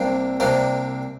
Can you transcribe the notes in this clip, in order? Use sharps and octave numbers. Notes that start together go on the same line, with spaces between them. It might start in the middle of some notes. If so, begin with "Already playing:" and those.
Already playing: C2 C3 A#3 D4
C2 C3 A#3 D4